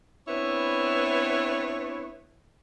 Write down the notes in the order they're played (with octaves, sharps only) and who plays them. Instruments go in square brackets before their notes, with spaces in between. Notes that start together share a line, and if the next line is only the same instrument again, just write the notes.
[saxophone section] B3 C4 D4 E4 B4 C#5